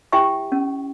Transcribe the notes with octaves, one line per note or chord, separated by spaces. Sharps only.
E4 G4 E5 G5 G#5 C#6
C#4